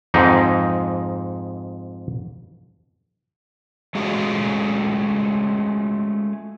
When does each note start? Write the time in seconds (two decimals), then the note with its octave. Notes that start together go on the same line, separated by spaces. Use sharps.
0.14 F2 G#2 D#4
3.95 G#3 A3 C#4 F4 F#4 G#4